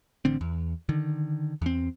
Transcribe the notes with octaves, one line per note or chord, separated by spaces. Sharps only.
A1 D3 C4
E2
D3 D#3
E2 C4